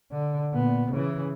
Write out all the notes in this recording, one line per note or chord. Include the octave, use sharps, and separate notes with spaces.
D3
A#2 B3
C#3 E3